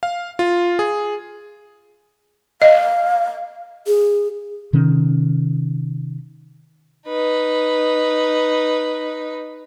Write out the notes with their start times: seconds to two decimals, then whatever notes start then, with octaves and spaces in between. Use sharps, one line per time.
0.03 F5
0.39 F4
0.79 G#4
2.62 D#5 F5
3.87 G#4
4.73 C3 D#3 C#4
7.07 D#4 B4